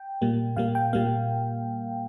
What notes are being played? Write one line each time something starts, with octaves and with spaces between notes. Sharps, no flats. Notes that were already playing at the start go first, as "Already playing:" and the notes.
Already playing: G5
A#2 G3 A#3
A#2 G3 A#3 F5
G5
A#2 G3 A#3 F5